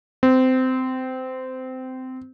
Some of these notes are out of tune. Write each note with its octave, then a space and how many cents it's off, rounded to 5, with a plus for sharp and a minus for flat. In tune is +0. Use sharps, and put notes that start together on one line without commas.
C4 -20